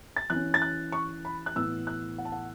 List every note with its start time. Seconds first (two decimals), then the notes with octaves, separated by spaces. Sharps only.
0.16 A6
0.30 E3 F#6
0.35 C#4
0.54 A6
0.62 F#6
0.92 C#6
1.25 B5
1.46 F#6
1.55 A2 E3 B3 E6
1.87 F#6
2.18 F#5
2.25 A5
2.32 F#5